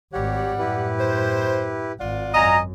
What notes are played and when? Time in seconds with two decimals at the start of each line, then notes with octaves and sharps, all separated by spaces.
0.13 G#1 G3 G4 C#5 F#5
0.59 F#2 A2 E4 G4 B4
0.99 C5
1.99 G#1 F4 D5 F#5
2.33 F#2 D#5 G#5 A#5